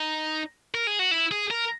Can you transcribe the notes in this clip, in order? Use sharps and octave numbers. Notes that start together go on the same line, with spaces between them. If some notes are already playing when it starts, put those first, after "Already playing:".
Already playing: D#4
A#4
G#4
F#4
E4
G#4
A#4